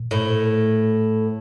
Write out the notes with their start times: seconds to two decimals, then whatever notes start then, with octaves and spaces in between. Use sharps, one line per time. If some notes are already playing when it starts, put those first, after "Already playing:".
Already playing: A#2
0.11 A2